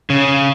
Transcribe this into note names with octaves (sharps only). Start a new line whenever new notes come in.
C#3